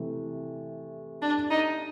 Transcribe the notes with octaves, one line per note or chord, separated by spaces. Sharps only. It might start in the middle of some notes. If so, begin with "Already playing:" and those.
Already playing: C3 E3 A3
D4
D#4